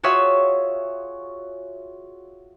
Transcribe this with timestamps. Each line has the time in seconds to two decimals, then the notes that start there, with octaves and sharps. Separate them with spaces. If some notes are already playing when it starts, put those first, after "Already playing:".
0.03 F4 F#4 G#4 C#5 E5